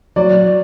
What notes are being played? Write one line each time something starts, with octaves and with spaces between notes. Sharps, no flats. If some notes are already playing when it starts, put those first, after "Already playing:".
F#3 D5